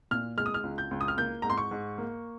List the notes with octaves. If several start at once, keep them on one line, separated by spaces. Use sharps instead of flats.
A#2 F6
G#3 F6
D#6
F6
C#2
G6
C#2
D#6
F6
A#3 G6
G#2 A#5
C6
C#6
G#2
A#3